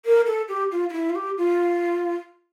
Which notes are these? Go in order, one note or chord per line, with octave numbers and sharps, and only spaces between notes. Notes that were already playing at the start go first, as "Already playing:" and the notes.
A#4
A4
G4
F4
F4
E4
F4
G4
F4